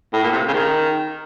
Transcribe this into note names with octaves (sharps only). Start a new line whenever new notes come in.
A2
A#2
C3
C#3
D#3